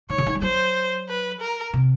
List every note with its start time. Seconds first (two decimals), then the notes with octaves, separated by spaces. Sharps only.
0.10 D#3 C#5
0.18 D3
0.26 D#3
0.35 G3
0.42 F#3 C5
1.09 B4
1.41 A#4
1.73 C3